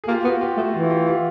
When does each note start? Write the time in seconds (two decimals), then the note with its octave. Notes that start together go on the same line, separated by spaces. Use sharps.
0.04 G#4
0.08 A#3 F4 G4
0.24 B3 F#4
0.41 F4 G4
0.57 A3 F#4
0.73 E3 F4
0.90 F4 G4
1.07 F4 G4